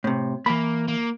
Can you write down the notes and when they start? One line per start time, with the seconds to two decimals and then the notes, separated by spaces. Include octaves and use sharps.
0.04 A2 C3
0.46 E3 A#3 B5
0.88 A#3